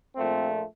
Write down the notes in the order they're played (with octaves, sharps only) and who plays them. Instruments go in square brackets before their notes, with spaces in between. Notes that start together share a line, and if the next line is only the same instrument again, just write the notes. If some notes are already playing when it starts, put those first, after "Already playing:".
[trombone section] A#1 A#2 F3 A3 C4